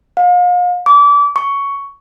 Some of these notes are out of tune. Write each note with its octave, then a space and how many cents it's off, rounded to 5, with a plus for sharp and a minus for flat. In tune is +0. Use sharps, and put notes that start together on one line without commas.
F5 +40
D6 -30
C#6 +10